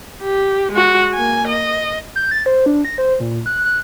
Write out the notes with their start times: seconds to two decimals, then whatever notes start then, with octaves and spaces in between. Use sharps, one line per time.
0.22 G4
0.72 G#3 F#4
1.14 A#3 G#5
1.48 D#5
2.16 G6
2.31 A6
2.46 C5
2.66 D4
2.85 A#6
2.98 C5
3.20 A#2
3.46 F#6
3.65 F#6